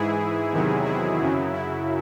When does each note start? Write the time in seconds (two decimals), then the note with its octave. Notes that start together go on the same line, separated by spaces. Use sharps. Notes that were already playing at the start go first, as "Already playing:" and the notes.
Already playing: G#2 E3 E4 G#4
0.50 E2 C3 D#3 F#3
0.85 E4
1.19 F#2 C#3 F#3
1.54 E4